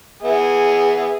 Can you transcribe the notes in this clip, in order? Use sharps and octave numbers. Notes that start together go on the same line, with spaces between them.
B3 G#4 E5